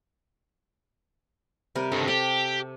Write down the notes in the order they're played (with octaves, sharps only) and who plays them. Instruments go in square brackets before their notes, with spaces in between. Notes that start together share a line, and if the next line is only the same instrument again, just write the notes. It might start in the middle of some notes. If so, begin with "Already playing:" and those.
[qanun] C3 G3 A#4
[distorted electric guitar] G2 D#3 [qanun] A4
[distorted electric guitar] G4 [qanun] A4